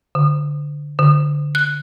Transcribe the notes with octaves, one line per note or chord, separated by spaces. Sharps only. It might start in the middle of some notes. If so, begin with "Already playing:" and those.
D3
D3
F#6